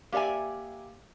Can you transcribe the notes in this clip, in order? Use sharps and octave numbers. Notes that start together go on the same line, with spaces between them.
A#3 G4 D5 E5 G#5